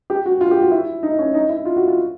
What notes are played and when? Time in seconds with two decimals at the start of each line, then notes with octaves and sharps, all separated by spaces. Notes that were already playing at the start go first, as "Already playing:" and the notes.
0.10 G4
0.26 F#4
0.41 F4
0.51 G4
0.61 F#4
0.71 E4
1.03 D#4
1.19 C#4
1.34 D#4
1.49 E4
1.65 F4
1.76 F#4
1.87 F4